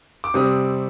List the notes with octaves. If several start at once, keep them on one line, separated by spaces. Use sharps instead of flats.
D6
C3 G3 C4 D#6